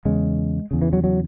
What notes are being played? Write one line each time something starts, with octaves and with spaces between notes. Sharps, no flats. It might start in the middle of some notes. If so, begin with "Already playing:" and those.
E2 C#3 G#3
E2 C#3
E3
F#3
F#3